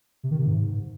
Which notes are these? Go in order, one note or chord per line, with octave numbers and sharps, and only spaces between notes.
C3
D#3
C3
G#2